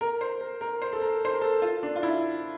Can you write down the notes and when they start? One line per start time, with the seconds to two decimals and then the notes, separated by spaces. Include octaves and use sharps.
0.01 A#4
0.21 C5
0.41 A#4
0.61 A#4
0.82 C5
0.93 A4
1.02 A#4
1.25 C5
1.33 A#4
1.41 A4
1.62 F4
1.83 D4
1.96 F4
2.03 E4